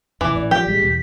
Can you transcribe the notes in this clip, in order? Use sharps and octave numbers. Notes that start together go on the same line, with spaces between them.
F2 B2 E3 D6
A1 D5
F3 G4
A1 G3 G#3 B6
E2 B2